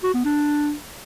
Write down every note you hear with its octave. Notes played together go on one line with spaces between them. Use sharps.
F#4
B3
D4